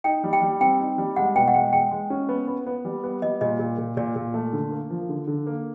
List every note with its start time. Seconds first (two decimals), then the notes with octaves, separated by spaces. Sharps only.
0.04 D#4 G5
0.24 G3
0.33 G5
0.42 G3
0.61 C4 G5
0.80 D#4
0.98 G3
1.16 G#3 F#5
1.35 B2 G5
1.48 F#5
1.54 G#3 G5
1.73 G#3 G5
1.91 G#3
2.10 C#4
2.29 B3
2.48 B3
2.66 B3
2.85 G3
3.04 B3
3.22 G3 D#5
3.41 A#2 D#5
3.59 A#2
3.78 A#2
3.97 A#2 D5
4.16 A#2
4.34 A3
4.53 D3
4.72 A#3
4.90 F3
5.09 D3
5.27 D3
5.47 A#3